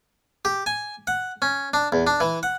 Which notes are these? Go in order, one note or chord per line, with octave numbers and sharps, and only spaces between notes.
G4
G#5
F#5
C#4
D4
E2
D4
E3
F#5